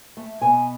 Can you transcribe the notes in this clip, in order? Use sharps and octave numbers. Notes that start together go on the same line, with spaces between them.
A3
B2 G#5